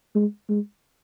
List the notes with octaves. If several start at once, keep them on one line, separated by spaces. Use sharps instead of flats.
G#3
G#3